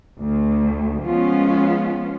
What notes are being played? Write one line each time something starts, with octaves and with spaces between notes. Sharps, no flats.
D2
F3 G#3 B3 C#4 F4